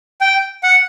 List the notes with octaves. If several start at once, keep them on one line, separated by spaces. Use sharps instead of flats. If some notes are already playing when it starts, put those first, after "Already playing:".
G5
F#5